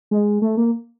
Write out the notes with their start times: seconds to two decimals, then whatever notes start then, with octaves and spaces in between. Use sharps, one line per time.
0.11 G#3
0.42 A3
0.57 A#3